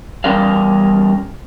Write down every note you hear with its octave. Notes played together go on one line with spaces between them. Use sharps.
E2 G3 C#4 A#4 D5 F5